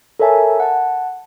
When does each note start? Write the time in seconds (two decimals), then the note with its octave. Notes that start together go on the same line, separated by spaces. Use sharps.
0.19 A4 A#4 C#5 E5 G#5 A5
0.60 F#5 A5